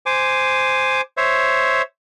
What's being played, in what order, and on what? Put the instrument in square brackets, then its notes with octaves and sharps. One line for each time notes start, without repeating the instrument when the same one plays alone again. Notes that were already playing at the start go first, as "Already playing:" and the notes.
[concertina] C5 G#5 D6
C5 C#5 E5